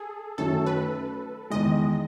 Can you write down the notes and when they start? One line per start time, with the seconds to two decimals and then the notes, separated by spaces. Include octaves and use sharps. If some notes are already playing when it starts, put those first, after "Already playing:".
Already playing: G#4 A4
0.38 F#2 D#3 F#3 A3 C#4 A4
0.66 B4
1.50 E2 D#3 G#3 D#5